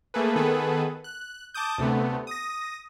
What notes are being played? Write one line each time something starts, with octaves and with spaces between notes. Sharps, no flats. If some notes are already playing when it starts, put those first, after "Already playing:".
A3 A#3 G#4 A4 B4
D#3 B3 G#4 A4 B4
F#6
A5 D6 D#6 G6
D2 C3 A3 B3
D#6 A#6